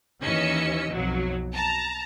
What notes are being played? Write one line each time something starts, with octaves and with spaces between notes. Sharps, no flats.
D#2 E3 C#4 D#5 E6 C#7
B1 F2 F#3
A5 A#5